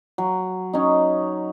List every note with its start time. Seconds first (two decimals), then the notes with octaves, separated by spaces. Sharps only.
0.18 F#3
0.73 C#4 D#4